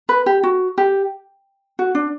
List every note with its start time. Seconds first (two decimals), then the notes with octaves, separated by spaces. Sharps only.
0.09 B4
0.26 G4
0.43 F#4
0.78 G4
1.79 F#4
1.95 D4